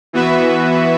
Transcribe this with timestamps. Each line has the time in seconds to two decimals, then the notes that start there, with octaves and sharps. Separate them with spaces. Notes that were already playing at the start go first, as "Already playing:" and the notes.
0.13 E3 B3 F#4 B4 E5